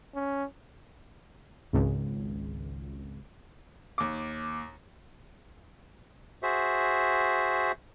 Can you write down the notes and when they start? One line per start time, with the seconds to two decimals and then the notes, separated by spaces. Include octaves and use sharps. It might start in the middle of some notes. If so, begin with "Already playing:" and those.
0.14 C#4
1.73 G#1 C#2
3.98 D#2 D6
6.43 F#4 G#4 C5 E5